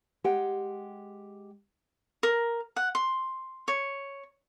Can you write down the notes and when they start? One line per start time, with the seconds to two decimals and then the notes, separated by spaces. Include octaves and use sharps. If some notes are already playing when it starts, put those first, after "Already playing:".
0.24 G#3 G4 F#5 G5
2.23 A#4
2.76 F#5
2.95 C6
3.68 C#5